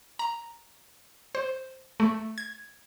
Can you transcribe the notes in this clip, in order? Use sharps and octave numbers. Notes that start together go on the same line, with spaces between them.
A#5
C5
A3
G#6